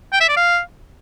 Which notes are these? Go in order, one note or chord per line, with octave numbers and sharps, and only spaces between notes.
G5
E5
D5
F5